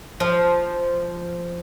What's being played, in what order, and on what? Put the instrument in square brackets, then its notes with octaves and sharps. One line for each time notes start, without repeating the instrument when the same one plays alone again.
[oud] F3